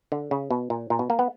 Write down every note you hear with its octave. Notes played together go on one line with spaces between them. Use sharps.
D3
C#3
B2
A#2
A#2
B2
A#3
B3